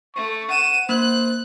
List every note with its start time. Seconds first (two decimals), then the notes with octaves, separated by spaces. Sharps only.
0.16 A3 C#6
0.50 F#5 D#7 E7
0.89 A#3 C5 F#6